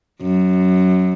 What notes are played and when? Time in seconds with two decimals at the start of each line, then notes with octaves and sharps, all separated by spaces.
0.22 F#2